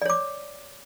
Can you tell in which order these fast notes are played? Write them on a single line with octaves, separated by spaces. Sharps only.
D5 C#5 D6